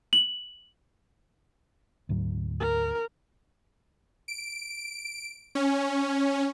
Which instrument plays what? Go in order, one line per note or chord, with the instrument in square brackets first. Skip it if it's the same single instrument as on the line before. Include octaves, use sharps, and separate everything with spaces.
[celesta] F#7
[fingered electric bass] D2 G#2 F#3
[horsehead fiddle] A#4
[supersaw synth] D7
C#4